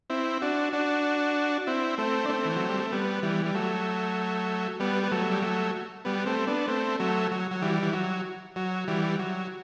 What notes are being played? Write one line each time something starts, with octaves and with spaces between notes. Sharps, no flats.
C4 E4
D4 F#4
D4 F#4
C4 E4
A3 C4
D4
A3 C4
E3
F#3
G3
A3
G3 B3
E3 G3
G3
F#3 A3
G3 B3
B3
F#3 A3
G3
F#3 A3
G3 B3
A3 C4
B3 D4
A3 C4
F#3 A3
F#3
F#3
E3 G3
E3
F#3
F#3
E3 G3
F#3